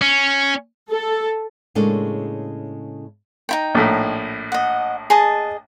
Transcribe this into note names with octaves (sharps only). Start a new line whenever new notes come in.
C#4
A4
A2 C#3 G#3 A#3 D4 A4
D#4 E4 G5
A#1 A2
D#5 F#5
G#4 D#5 A5